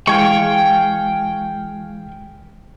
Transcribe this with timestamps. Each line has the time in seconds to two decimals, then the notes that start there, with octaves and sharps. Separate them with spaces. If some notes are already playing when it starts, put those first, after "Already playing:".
0.07 E3 G#3 F5 G5 G#5 C#6